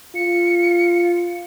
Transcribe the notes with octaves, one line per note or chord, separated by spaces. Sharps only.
F4 C#7